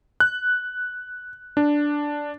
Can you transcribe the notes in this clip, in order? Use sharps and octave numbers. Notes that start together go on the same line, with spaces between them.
F#6
D4